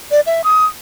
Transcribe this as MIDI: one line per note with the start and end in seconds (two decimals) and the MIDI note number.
0.11 0.21 74
0.27 0.42 76
0.44 0.66 87